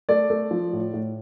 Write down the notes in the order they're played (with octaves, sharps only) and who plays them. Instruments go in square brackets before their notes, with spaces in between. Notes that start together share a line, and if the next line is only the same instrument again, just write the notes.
[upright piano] A3 D5
A3
F3
A2
A2